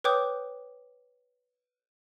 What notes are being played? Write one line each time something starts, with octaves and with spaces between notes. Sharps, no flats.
B4 C#5 G5 D6 D#6 G6